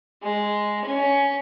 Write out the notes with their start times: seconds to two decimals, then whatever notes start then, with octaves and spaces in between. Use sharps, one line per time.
0.23 G#3
0.85 C#4